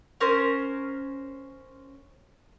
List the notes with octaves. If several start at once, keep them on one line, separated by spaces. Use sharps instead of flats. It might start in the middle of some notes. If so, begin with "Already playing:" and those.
C#4 A#4 C5